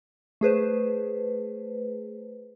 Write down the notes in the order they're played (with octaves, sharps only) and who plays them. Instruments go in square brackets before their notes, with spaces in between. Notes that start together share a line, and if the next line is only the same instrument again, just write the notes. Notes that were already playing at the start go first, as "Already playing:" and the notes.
[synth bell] A3 G#4 B4 C5